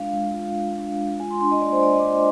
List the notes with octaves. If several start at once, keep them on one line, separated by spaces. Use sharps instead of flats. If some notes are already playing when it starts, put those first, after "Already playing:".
Already playing: G#3 D4 F4 F5
G#3
F4
F4
D4
G#3
F4 G#5
C6
D4 C6
D#5
A#3 D5
C5
F4 D5
D#5
D6
F4 C6